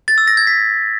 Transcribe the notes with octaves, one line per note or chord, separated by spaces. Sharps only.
A6
E6
A#6
G#6
B6